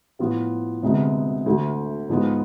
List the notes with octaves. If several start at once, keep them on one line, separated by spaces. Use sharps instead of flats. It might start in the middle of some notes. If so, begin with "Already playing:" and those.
A2 F3 B3 F4
D2 C3 G#3 B3
D2 D3 A3
G#2 F3 G#3 B3 F4